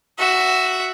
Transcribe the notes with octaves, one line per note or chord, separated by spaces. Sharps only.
F#4 E5